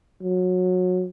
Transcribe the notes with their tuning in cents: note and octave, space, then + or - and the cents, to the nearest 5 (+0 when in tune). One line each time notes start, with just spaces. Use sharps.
F#3 -25